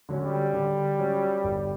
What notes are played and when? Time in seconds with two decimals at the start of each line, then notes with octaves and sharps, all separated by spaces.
0.09 D3 F#3 C#4
0.23 G3
0.53 D3
0.99 F#3 C#4
1.44 G1